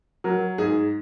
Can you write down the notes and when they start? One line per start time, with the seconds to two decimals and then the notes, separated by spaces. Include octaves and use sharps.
0.24 F#3 A#4
0.58 G#2 G#4